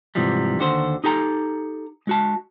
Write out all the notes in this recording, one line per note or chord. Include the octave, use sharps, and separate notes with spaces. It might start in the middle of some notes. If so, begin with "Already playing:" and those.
G#2 C3 E3 F3 G3
D#2 D3 F#4 C5
D#4 G4 A4 G#5 A#5
G#3 F#4 A5